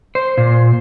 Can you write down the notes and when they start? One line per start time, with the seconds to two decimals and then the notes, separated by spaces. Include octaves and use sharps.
0.15 C5
0.37 A#2